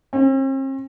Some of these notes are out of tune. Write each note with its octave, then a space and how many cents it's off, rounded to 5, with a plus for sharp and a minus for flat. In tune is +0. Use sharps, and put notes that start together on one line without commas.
C4 +45